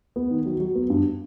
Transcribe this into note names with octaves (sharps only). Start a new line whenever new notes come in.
B3
D#3
F#3
F#3
B3
G2